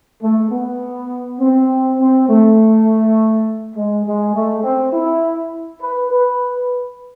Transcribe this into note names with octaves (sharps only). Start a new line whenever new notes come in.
A3
B3
C4
C4
A3
G#3
G#3
A3
C4
E4
B4
B4